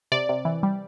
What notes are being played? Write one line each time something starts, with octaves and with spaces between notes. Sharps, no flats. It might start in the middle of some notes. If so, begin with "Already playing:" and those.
C3 D5
C3
E3
G3